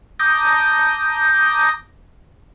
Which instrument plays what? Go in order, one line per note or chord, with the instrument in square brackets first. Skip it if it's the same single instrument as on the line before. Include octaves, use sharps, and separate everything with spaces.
[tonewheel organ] A5 A#5 D6 D#6 G6 A#6